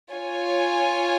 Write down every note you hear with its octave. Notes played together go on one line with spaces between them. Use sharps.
F4 C#5 G#5